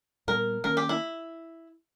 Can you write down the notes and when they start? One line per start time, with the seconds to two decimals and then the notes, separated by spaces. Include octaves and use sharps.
0.27 A#2 G3 B3 A#4
0.64 D#3 A#3 C#4 A#4
0.77 G4
0.89 E4